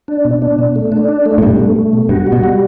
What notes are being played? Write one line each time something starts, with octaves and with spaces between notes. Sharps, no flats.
D4
B2
D4
B2
A3
D4
D4
A3
A2
G2 B2
A3
A3
B2
G2 F#4
G3
B2
G3